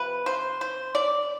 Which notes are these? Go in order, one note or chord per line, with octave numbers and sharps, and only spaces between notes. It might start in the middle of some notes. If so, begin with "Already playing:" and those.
Already playing: C3 F3 B4
C5
C5
D5